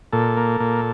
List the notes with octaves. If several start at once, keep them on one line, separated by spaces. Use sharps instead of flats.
A#2 A4
A#3
A#2